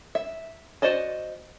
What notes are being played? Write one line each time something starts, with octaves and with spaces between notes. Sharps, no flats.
E5
F#4 C5 D5 D#5 A5